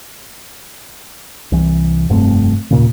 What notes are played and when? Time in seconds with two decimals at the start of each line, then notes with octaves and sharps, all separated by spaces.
1.52 C2 E3
2.09 F1 G2 A3 C4
2.71 D#2 A#2 C#3